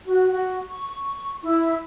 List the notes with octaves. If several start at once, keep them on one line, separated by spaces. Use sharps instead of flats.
F#4
F#4
C#6
E4